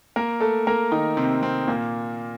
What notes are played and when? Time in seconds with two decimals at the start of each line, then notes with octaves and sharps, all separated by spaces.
0.16 A#3 A#4
0.40 A3 A4
0.67 A#3 A#4
0.92 D#3 D#4
1.17 C3 C4
1.42 C3 C4
1.68 A#2 A#3